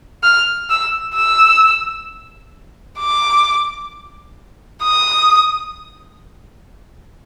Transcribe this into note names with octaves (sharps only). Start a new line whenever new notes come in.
F6
E6
E6
D6
D#6